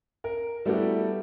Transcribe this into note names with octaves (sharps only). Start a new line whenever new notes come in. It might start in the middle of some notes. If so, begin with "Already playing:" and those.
A#4
G3 A3 B3 E4 F#4 G4